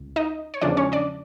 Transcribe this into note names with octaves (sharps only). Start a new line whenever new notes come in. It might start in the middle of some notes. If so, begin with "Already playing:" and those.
Already playing: C#2
D#4 D#5
C#5
E2 C#3 F3 G#3 D4 D5
C#4 C#5
D4 D5